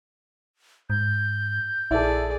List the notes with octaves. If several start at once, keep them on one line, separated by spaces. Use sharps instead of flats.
G#2 G6
A#1 E4 G#4 A4 D5